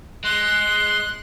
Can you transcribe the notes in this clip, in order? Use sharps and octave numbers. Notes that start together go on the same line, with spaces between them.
G#3 C6 F#6